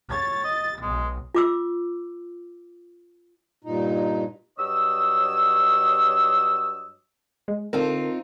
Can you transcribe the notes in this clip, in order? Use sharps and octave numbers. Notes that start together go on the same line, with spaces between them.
C#5 A6
D#5
B1 G#3
F4 D6 E6
G2 A#2 D#4
G2 F#3 C#5 D#5 E6
G#3
D3 C4 D#4 F4 A4 A#4